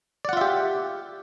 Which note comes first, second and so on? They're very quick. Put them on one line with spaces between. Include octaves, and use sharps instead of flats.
D5 F#5 F4 E5 G4